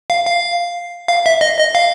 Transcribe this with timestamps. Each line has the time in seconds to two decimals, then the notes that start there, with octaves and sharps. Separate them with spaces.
0.10 F5
0.26 F5
1.08 F5
1.26 E5
1.41 D#5
1.59 D#5
1.75 F5